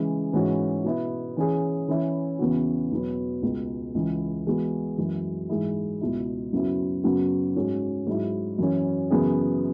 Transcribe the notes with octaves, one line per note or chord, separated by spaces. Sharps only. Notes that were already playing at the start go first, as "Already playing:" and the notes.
Already playing: C#3 E3 G#3
G#2 E3 C#4 F#4
B2 B3 E4
E3 C#4 G#4
E3 C#4 E4
E2 C#3 E3 B3 F#4
E2 B2 F#3 B3
C#2 B2 G#3
C#2 C#3 E3
E3 G#3 B3 F#4
F#2 E3 G#3
G#2 E3 G#3 E4 G#4
C#2 B2 B3 E4
F#2 C#3 F#3 B3 E4
F#2 C#3 F#3 B3 F#4
G#2 F#3 C#4
G#2 F#3 E4
F#2 E3 C#4
F#2 C#3 E3 B3 G#4